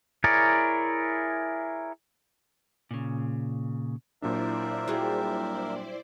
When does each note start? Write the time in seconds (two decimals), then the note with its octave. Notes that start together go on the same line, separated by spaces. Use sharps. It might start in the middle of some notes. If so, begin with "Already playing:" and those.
0.24 E4 G#4 A#4 C#5 D5
2.91 A#2 C#3
4.22 A#2 F#3 D4 E4 A#4 C5 D5 E5
4.88 G3 F#4 G#4